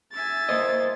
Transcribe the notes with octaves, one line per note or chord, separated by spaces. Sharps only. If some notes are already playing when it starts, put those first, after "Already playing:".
E5 G#5 A6
A#3 C5 D#5